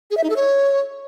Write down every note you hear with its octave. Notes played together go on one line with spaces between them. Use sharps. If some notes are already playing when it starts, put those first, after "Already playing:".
G#4
E5
D#4
A4
C#5